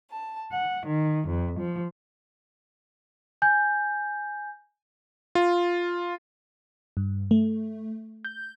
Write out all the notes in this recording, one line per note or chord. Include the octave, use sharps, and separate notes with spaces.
A5
F#5
D#3
F2
F3
G#5 G6
F4
G2
A3
G6